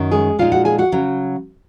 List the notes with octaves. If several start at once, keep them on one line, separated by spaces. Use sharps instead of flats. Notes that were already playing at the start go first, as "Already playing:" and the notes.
Already playing: F#2 D#3
G#3 G#4
A#2 G#3 D#4 F4 F5
F#4 F#5
G#4 G#5
F#4 F#5
C#3 F#3